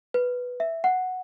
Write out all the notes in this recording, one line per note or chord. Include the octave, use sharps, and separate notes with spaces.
B4
E5
F#5